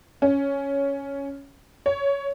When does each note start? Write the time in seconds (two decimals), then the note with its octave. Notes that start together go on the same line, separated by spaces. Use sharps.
0.22 C#4
1.86 C#5